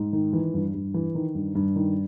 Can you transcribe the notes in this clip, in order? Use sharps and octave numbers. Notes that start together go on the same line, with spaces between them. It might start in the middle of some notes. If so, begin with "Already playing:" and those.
Already playing: G#2
D#3
E3
G2
G2
E3
D#3
G2
G2
D#3